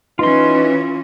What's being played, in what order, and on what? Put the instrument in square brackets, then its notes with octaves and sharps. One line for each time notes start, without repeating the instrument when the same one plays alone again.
[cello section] E3 C#4 [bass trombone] D#4 [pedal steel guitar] F4 C6 [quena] B4